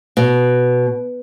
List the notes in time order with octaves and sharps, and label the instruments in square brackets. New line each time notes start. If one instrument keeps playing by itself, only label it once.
[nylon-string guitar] B2